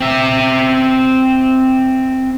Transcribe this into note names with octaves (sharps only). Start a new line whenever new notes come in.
C4 E5